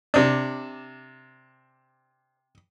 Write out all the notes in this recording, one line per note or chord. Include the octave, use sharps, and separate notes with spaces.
C3 D4